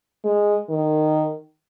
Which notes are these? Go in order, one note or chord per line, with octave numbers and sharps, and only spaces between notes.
G#3
D#3